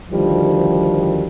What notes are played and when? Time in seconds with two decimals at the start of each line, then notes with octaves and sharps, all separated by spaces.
0.11 D2 D#3 F3 G3